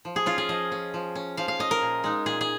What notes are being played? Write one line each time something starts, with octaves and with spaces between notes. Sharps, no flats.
F3
G#4
C#4 F4
G#4
F3 D#5
C#4
F3
C#4
F3 F5
F5
C#4 D#5
A#4
A#2
G#3 D#4
A#2 G#4
G#4